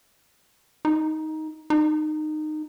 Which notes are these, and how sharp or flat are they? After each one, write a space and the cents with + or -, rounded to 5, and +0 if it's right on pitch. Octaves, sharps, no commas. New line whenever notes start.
D#4 +10
D#4 -20